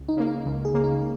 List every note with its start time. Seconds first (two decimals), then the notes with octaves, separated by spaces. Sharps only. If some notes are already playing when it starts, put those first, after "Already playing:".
Already playing: C#2
0.08 D#4
0.17 C#3 A#3
0.27 D#4
0.45 C#2 D#4
0.65 G#4
0.74 C#3 A#3
0.84 D#4